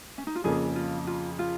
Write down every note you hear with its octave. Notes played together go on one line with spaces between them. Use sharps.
C#4
D#4
F4
F2 C#3 A#3 G#4
F4
F4
F4